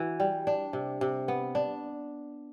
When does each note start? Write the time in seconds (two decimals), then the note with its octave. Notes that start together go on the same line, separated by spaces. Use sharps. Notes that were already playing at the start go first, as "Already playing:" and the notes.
Already playing: E3 F#4
0.20 G3
0.47 D4
0.73 C3
1.01 C3
1.28 B3
1.55 D4